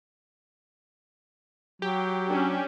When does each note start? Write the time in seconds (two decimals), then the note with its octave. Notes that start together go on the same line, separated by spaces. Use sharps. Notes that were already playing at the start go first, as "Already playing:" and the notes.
1.82 F#3 G4
2.30 C#4 D4